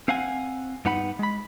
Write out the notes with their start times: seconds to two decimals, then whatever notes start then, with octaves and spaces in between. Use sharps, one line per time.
0.08 C4 F5 F#5 G#5
0.85 G2 B3 D#4 F#5 B5
1.19 G#3 B5